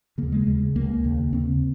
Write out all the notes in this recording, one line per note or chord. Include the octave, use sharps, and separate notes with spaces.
D#2 C#3 A#3
G#3
D#2 C#3 G#3
C#2 C3 A#3
D#2 C#3
D#2 C#3 C4